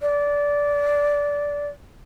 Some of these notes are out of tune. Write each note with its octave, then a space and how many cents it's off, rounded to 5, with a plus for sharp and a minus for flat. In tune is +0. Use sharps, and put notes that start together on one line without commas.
D5 -15